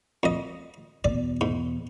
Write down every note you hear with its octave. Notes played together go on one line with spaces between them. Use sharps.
F2 D#5
E2 B2 D5
G#2